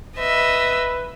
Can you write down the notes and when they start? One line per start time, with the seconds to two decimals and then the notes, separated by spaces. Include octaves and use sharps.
0.18 B4 D#5 E5